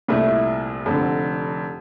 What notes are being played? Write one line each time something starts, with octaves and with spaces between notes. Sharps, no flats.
C2 A#2 A3 E4
F1 F2 D3